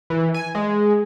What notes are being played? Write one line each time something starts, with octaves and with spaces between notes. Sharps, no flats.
E3
G#5
G#3